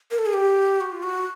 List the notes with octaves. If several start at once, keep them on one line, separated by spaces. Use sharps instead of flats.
A#4
A4
G#4
G4
F#4
F4
F#4